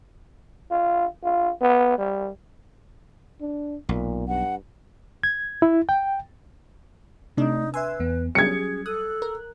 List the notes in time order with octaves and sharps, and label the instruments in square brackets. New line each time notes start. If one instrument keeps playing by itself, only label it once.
[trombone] F4
F4
B3
G3
[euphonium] D4
[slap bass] B1 [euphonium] A#2
[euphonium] G2 [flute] F#5
[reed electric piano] G#6
E4
G5
[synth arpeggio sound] C3 D4 [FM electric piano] A3 [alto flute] D#4
[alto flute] B4 [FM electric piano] E5 C6 E6 [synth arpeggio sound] G#5
[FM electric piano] E2 B3
[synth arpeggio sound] F#3 G3 [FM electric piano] C#4 [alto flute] G#4 [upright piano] G#6 C#7
[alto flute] A4 [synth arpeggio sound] D#6 [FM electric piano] F#6
[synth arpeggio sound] A#4